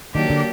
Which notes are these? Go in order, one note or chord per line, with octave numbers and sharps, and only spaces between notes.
D#3 F#3 A#3 D4 G4
D3